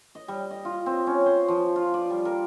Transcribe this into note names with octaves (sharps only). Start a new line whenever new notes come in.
D#5
G3
D#5
F4
C4
C#4
C5
F3
F4
D5
G3
A#4